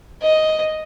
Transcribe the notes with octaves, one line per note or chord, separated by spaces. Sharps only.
D#5